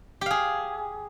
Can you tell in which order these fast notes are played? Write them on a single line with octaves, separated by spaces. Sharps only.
G4 F5 G#4